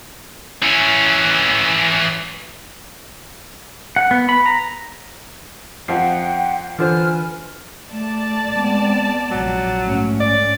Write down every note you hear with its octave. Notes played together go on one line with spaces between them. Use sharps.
E3 C#4
F#5
B3
B5
A#5
F2 F3 F#5 G5 C7
D3 E3 F4 B4 C5 G#5 F6
A3 D5 A5
G#3 B3 C4
A#1 F2 C3 F#3
G#2 A3 C#4
D5